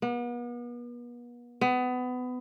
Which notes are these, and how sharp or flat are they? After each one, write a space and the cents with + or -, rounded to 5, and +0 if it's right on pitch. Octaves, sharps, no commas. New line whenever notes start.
B3 -40
B3 +25